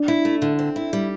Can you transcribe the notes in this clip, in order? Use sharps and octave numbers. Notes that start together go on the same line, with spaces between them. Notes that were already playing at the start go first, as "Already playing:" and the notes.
Already playing: D4
E4
A3
D3
C4
E4
G3